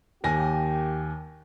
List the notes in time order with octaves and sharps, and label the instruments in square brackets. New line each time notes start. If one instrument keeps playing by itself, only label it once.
[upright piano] D#2 G#5 A#6 [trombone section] A#3 G4